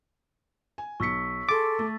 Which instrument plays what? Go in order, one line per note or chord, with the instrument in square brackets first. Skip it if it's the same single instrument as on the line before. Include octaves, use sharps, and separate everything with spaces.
[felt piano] G#5
[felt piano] B1 C#7 [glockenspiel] C#6 E6 B6
[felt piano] G#4 C6 [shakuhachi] A4 [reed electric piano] D6 [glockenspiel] A6
[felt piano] A3